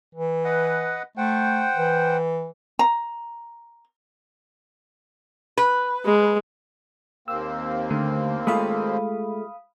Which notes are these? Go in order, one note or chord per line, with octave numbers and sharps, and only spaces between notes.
E3
B4 D#5 F#5
A3 C5 F#5 G5
E3
A#5
B4
G#3
D#2 A#3 C4 E6
D3 A3
G#3 A3 F4 F5 B5 D#6